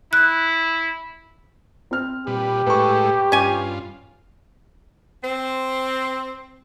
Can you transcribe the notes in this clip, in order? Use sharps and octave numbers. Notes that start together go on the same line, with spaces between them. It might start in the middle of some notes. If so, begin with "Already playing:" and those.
E4 F#6
C4 F6
A#2 G3 G4 B4
A2 G#3 A4 B4 C#6
G2 C#4 F4 G#5
C4